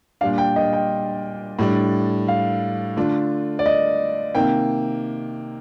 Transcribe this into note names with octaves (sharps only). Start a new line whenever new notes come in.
A#2 G3 D4 F5
G5
D#5
G5
A2 G3 D4
F5
D3 A3 D4 F4
D5
D#5
C3 D#3 A#3 G5